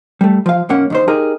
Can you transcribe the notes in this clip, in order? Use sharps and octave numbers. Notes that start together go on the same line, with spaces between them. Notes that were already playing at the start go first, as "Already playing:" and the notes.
G3 A3
F3 F5
B1 F#2 A#3 C#4 F#5
D#2 D#3 C5
D#4 G4 G#4 A#4 A#5